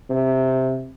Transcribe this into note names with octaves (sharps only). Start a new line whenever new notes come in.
C3